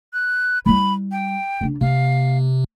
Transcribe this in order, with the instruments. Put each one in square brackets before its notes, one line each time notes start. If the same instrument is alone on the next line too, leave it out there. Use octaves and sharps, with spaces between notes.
[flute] F#6
[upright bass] G3 E4 [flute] B5
[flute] G5
[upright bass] C#3 D4
[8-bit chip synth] C3 [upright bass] A#3 [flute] F5